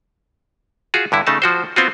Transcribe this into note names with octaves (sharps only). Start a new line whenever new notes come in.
F4 F#4 G#4
G2 D3 E4
C#3 A3 D#4 A5
F3 F#4 C5
B3 C4 F4 F#4